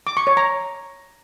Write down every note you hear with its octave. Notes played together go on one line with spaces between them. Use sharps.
D6
C#6
C#5
A#5